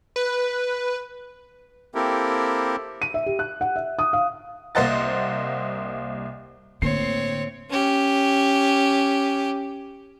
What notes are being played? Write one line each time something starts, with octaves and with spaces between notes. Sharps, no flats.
B4
A#3 C4 E4 G4 A4 A#4
D#7
E5
G4
F#6
F#5
E5
D#6
F5
C2 A#3 C5 D#5 F#5 A6
A2 D3 A#3 C4 C#5 C7
C#4 G4